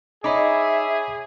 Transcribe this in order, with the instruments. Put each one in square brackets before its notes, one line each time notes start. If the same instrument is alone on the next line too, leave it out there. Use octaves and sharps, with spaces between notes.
[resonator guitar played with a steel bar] D#4 [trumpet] G#4 [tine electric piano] C#5 B5 D6 [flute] E5